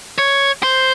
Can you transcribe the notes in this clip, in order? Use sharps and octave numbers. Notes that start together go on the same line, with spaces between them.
C#5
C5